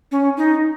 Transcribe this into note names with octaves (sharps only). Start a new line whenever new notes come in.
C#4
D#4